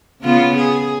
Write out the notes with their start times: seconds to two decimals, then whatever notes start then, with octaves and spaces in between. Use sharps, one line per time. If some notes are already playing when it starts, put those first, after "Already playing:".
0.22 C#3 B3 F4
0.58 G#4